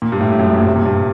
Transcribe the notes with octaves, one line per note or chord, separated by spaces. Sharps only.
A#2
G2
A2
G2
F#2
G2
A#2
C3
A#2
G2